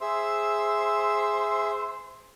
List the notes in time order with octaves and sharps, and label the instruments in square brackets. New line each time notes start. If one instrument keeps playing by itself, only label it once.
[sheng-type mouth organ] G#4 E5 E6 [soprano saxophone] C5